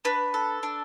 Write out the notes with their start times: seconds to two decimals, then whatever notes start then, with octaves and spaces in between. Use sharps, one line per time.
0.05 D4 B4
0.34 A4
0.63 D4